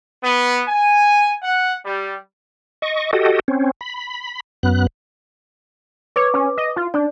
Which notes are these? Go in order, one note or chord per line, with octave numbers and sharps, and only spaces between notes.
B3
G#5
F#5
G3
D#5 C#6
F#4 G4 A4 D#5
C4 C#4
B5
F#2 B3 F#6
B4 C#5 D6
C#4
D#5
F4
D4 D5